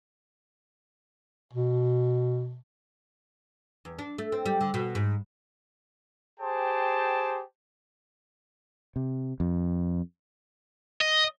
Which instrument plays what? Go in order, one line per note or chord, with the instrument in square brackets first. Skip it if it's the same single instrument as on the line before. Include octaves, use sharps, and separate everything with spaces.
[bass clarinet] B2
[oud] E2
D4
A3
C4
G3
D3
B2
G#2
[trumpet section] G4 G#4 C5 G5 A5
[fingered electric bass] C3
F2
[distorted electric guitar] D#5